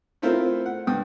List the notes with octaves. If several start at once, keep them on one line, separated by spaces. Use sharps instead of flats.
A3 C4 E4 F4 A#4 C5
F#5
G2 G5 D#6